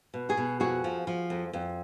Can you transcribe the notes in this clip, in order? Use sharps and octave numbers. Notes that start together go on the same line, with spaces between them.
B2
F#4 G#4
B2
F2 F#4 G#4
F3
F3
F2
F2